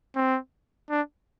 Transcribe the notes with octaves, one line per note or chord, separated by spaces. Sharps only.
C4
D4